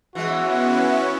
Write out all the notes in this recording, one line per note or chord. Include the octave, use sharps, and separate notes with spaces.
E3 G#3 B3 C#4 E4 F#4